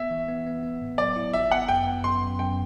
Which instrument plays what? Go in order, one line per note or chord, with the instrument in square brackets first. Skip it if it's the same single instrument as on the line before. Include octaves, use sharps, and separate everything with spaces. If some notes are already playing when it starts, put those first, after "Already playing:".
Already playing: [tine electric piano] B3 [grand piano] E5
[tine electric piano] E3
B3
B3
B3
A2
[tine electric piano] F#3 [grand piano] D5
[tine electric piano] E4
[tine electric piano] G1 [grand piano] E5
[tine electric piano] B3 [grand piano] F#5
[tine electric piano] F#2 [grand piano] G5
[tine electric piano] B3
[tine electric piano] F#2 [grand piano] C6
[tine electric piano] F#2
[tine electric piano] F#2 [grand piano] G5